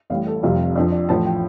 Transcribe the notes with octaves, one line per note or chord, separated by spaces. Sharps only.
A1 A2 G3 F5
A4
F1 F2 C3 G3 F4
F2 F3 D4
D5
A1 A2 F3 A5
G5